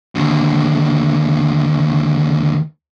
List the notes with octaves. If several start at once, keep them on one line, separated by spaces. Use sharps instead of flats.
D#2 D3